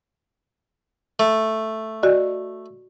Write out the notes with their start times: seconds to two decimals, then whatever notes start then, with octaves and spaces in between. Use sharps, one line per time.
1.19 A3
2.03 F#4 D5 D#5